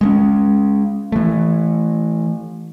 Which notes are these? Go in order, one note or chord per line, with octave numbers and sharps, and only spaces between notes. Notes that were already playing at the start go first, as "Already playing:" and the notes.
G#3 A3 C#4
E3 A3